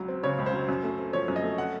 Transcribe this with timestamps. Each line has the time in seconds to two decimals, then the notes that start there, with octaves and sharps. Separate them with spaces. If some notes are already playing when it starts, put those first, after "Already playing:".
Already playing: C#2 F#3
0.08 C4
0.23 C#3 C#5
0.39 C#2
0.46 C5
0.53 F#3
0.69 F#2
0.83 A3
0.98 C4
1.13 F3 C#5
1.28 F#2
1.36 D#5
1.43 A3
1.58 F#5